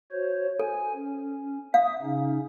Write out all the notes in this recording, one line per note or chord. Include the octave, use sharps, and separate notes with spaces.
F#4 C5 C#5
A4 G#5
C#4
E5 F5 D#6
C#3 C#4 D#4